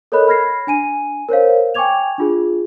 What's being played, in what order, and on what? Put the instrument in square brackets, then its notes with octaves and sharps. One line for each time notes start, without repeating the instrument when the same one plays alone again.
[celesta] A4 A#4 C#5 D#5 B5 F#6
B5 F6 G#6 A#6 C7
D4 G#5 D#7
A#4 C5 C#5 F5
G5 G#5 C#6 D6 G#6 F7
D4 F4 G#4